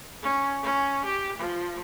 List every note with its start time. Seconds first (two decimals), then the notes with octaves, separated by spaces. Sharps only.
0.23 C#4
0.63 C#4
1.05 G4
1.38 F3